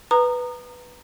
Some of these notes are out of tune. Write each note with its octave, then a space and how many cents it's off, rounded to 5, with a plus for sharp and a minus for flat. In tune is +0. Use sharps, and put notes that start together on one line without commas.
B4 +0 A#5 -10 D#6 -30